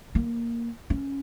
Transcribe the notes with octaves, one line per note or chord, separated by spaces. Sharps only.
A#3
C#4